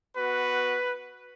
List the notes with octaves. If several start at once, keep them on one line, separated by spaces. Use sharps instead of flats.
B3 F#4 B4